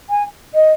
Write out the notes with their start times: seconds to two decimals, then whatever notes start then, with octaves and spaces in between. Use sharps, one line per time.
0.09 G#5
0.54 D#5